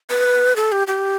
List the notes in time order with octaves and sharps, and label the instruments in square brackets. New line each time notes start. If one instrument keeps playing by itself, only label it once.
[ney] B4
A4
G4
G4